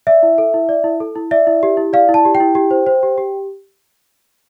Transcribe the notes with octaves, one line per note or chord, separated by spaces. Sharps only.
D5 E5
E4
A4
E4
D5
E4
A4
E4
D5 E5
E4
G4
E4
D5 F5
E4
A5
G4
G5
E4
G4
C5
C5
G4
G4